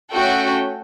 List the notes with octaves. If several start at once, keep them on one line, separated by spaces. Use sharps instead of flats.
A3 C#4 F#4 A4 G5